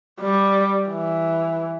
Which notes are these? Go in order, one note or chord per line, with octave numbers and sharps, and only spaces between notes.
G3
E3